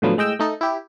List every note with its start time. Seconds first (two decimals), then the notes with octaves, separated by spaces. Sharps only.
0.02 A2 D3 F3 F#3 B3
0.17 A2 G#3 D#5 G5 E6
0.39 A3 D#4 A4
0.61 E4 G4